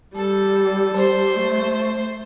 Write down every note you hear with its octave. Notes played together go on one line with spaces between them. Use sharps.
G3 A4
G3 C5
A3